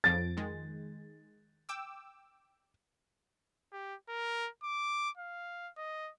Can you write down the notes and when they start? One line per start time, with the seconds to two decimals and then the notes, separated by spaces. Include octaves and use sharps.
0.04 F2 F3 A6 D7
0.37 D#3 G#3
1.69 G5 D6 E6
3.72 G4
4.09 A#4
4.63 D6
5.18 F5
5.77 D#5